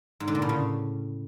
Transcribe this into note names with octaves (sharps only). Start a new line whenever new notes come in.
G#2
D3
A#2
A2
C#3